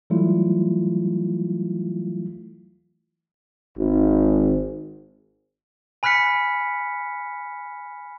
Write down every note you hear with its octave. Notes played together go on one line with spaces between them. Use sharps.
E3 F#3 G3 A3 E4 F4
G#1
G#5 B5 F6 F#6 B6 C#7